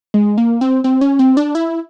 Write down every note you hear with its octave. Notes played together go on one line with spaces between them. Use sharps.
G#3
A#3
C4
C4
C#4
C4
D4
E4